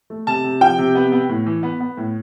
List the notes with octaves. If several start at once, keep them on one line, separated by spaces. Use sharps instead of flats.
A3
C3 A5
C3
F3 G5
C3
B3
B3
A2
E3
B3
B3
A2